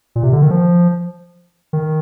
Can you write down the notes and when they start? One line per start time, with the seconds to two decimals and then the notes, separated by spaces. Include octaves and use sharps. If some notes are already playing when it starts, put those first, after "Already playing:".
0.16 A#2
0.23 C3
0.33 D3
0.42 D#3
0.51 F3
1.73 D#3